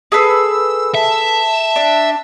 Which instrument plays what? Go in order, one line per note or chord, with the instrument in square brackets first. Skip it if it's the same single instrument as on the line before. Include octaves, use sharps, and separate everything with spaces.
[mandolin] G#4 A4 B4 [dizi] E6
[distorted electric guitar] E5 [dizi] A5
[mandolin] D4